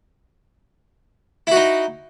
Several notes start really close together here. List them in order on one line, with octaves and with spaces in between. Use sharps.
E4 F#4 D#4